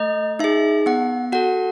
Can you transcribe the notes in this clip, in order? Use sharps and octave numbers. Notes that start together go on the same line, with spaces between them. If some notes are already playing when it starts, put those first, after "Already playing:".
Already playing: A3 D#5
D#4 G#4 E5
B3 F#5
F#4 A4 F#5